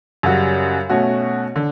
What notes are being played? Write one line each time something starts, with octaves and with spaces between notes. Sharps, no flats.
F#2 C#3 G3 C#4 F#4
B2 A3 C#4 F#4
D3